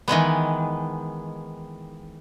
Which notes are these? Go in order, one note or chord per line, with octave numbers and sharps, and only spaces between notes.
D#3 E3 G#3 B3